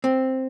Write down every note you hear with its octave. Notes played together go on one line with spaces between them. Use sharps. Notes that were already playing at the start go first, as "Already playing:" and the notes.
C4